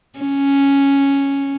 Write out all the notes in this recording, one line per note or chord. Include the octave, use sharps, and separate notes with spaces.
C#4